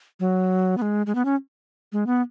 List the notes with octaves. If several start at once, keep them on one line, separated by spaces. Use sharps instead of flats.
F#3
B3
G#3
G#3
B3
C#4
G#3
B3